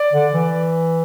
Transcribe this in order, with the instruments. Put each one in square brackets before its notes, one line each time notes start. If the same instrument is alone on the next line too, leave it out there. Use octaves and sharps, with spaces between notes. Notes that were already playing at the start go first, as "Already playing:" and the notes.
Already playing: [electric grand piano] D5
[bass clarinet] D3
E3